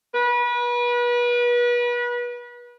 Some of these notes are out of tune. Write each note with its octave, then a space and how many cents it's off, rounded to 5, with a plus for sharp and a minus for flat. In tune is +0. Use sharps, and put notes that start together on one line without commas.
B4 -35